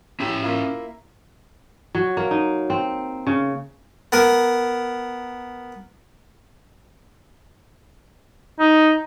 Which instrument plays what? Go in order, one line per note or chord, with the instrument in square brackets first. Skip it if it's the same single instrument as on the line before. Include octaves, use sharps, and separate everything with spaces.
[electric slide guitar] C#4 E5 [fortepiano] E4 G4
[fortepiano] A#3 E4 F4
[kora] F#3
A#3
D#4
C4
C#3
[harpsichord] B3 A#4
[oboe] D#4